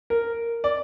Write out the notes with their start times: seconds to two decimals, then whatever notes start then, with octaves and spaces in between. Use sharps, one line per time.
0.10 A#4
0.64 D5